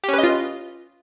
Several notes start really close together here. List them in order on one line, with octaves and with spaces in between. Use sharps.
G4 C#4 B4 D#5 F4